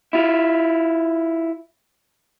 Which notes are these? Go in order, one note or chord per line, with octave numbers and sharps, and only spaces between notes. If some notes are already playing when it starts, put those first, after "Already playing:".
E4 F4